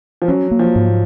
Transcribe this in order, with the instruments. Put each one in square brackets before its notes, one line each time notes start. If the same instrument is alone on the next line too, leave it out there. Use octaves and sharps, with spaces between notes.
[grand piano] F3
[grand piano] F#3 [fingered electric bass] C#4
[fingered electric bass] A#3
[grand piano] F3
[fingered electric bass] G#2